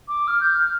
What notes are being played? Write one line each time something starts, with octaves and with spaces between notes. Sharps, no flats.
D6
F6
G6
F6